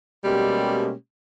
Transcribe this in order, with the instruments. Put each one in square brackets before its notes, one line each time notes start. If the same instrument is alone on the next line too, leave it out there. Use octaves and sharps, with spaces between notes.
[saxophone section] B2 G3 G#3 A#3 C#4 G4